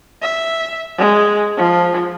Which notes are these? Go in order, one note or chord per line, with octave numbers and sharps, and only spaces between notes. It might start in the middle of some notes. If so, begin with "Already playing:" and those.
E5
G#3
F3